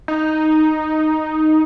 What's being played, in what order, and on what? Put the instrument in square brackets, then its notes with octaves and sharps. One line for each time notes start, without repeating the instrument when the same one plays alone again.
[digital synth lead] D#4